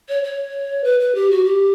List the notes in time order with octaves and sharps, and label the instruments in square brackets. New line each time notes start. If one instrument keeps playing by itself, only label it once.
[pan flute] C#5
C#5
B4
B4
G4
F#4
G4